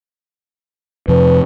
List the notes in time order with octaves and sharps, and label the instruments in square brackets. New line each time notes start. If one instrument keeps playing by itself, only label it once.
[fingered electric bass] F2 C3 [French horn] B4